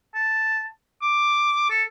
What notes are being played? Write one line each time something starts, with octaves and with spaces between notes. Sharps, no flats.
A5
D6
A4